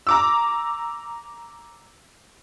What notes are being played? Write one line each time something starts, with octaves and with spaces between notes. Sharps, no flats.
A#5 D6 E6